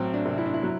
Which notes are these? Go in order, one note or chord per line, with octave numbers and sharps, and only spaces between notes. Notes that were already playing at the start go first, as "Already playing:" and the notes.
Already playing: A1 F#3 C4
D4
C3
E4
D4
E4
F#3